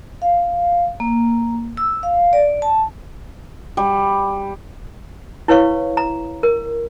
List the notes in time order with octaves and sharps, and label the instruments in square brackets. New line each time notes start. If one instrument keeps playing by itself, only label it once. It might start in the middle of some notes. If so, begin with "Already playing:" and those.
[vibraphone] F5
A#3
E6
F5
D5
A5
[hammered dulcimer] G3
[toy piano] E4 B4 C#5 F5 C#6
A#5
A#4